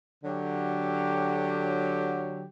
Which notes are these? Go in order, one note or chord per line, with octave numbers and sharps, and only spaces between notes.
D3 F#3 G4